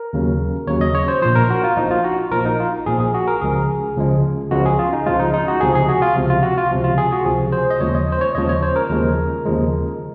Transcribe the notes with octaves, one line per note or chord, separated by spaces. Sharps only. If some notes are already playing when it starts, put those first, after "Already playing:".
Already playing: A#4
D#2 C#3 F#3
D#2 C#3 F#3 C#5
D#5
C#5
C5
A#1 A#2 F3 C5
A#4
F#4
F4
A#1 A#2 F3 D#4
F4
F#4
A#1 A#2 F3 A#4
D#4
F4
A#1 A#2 F3 G#4
G#4
F#4
A#4
C#2 C#3 F3 G#3 G#4
C#2 C#3 F3 G#3
C#2 C#3 F3 G#3 F#4
G#4
F4
D#4
C#2 C#3 F3 G#3 F4
D#4
D#4
F#4
C#2 C3 F3 G#4
G#4
F#4
F4
C#2 C3 F3
F4
F#4
F4
C#2 C3 F3
F4
G#4
F#4
C#2 C3 F3 G#4
C5
D#5
D#2 C#3 F3 G#3 C#5
D#5
C5
C#5
D#2 C#3 F3 G#3 D#5
C#5
C5
A#4
D#2 C#3 F3 G#3
D#2 C#3 F3 G#3